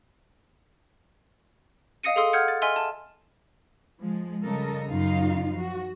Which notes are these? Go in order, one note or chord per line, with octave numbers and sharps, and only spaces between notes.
D#5 F5 D#6 A#6 C#7 D#7
G#4 A4 F5 C6 D#6 E6
F#5 E6 F6 G6 G#6 C#7
A6
D#5 E5 G#5 C6 E6 F6
A5
F3 G#3
C#3 G3 A4 A#4 D#5
F#2 C#3 D#4 F4 F5
F3 F#4